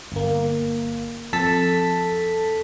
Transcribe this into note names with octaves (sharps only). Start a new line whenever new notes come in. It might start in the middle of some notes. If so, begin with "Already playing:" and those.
G1 A#3
F2 A4 A5 B6